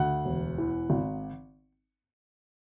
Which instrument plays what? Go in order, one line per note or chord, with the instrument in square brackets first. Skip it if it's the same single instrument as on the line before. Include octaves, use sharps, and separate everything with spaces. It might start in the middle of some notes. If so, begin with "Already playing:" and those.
Already playing: [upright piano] D2 F#5
E1
E3
G#1